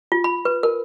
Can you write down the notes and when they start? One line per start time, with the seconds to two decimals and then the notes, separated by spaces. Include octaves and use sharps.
0.12 F4
0.24 B5
0.45 B4
0.63 A#4